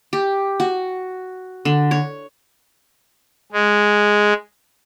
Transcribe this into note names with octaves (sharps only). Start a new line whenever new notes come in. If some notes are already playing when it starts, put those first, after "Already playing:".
G4
F#4
D3
C#5
G#3